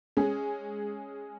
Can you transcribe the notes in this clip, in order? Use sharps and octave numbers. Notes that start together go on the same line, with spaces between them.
G#3 C#4 G#4